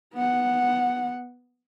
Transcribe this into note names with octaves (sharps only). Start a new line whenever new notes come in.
B3 F#5